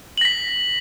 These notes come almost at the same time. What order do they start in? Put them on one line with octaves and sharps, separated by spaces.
F#7 A#6 B6